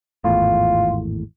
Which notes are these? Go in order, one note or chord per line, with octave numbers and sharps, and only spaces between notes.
G#1 E2 A2 F4